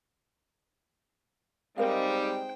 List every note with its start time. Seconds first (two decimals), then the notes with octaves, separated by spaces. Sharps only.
1.78 G3 G#3 C4 D#4 A#4 C5 F5 G5